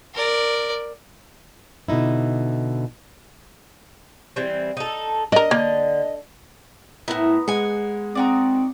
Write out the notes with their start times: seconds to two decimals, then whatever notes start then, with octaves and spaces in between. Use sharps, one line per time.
0.14 A#4 D5
1.88 B2 D3 D#4 E4
4.36 E3 G3 C4
4.77 D#4 A4
5.32 D4 A#4 D#5
5.51 D3 A#3
7.08 A2 B3 E4 A#4
7.48 G#3 F#5 G#5
8.15 C4 D#4 F#4 D5